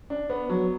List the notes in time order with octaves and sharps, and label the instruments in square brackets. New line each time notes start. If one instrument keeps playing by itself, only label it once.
[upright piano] D4
B3
F#3